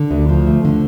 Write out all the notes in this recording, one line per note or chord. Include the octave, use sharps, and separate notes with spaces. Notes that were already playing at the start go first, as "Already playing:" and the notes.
Already playing: D3
D2
F3
A3
D3